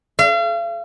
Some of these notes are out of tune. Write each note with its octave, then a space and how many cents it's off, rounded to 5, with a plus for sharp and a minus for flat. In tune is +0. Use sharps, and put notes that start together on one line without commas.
F5 -40